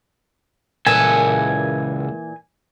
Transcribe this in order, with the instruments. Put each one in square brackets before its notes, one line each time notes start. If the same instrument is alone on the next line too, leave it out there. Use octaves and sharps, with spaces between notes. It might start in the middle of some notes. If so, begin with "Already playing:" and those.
[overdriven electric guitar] C#2 A4 [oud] A#2 E3 [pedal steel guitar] G#5